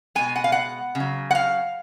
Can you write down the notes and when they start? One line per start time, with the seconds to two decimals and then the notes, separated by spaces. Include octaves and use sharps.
0.15 B2 G#3 G#5
0.36 F#5
0.44 F5
0.52 F#5
0.95 C#3
1.00 F#3
1.31 F#5
1.35 F5